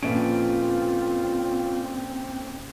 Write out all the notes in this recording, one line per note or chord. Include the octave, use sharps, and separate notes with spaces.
A#1 F3 C4 C#4 F4 A4 B4 D7